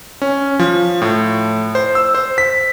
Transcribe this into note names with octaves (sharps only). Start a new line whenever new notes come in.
C#4
F3
A2
C5
E6
C5
B6